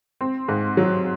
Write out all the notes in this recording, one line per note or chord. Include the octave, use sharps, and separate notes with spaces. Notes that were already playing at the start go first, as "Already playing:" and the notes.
C4
G#2
F#3